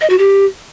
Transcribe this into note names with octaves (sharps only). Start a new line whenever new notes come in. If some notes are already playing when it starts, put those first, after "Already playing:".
D#5
F#4
G4